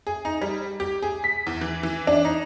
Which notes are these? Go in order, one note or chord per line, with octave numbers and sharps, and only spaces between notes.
G#4
D#4
G3
G4
G#4
B6
E2
E3
E3
D4
D#4